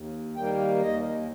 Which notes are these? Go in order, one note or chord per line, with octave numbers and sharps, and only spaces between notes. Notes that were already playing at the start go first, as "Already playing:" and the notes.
Already playing: D#2
D#3 G3 A#3 G5
D#2 D#5